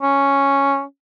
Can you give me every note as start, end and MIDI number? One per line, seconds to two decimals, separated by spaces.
0.03 0.83 61